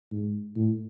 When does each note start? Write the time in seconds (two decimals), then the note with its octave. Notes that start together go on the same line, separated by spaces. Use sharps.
0.11 G#2
0.56 A2